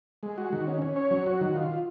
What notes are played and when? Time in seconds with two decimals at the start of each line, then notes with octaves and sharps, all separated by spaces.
0.23 G#3
0.38 F#4
0.53 D#3
0.67 C#4
0.82 C#4
0.96 C#5
1.11 F#3
1.26 F#4
1.41 D#3
1.55 F4